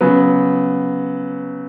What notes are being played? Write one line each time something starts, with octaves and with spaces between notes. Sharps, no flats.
C#3 F#3 B3